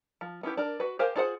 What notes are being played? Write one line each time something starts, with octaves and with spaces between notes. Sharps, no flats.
F3
B3 C#4 E4 G4
D4 A#4
F#4 B4
G4 A#4 C5 F5 G#5
D4 F4 G#4 C5 F#5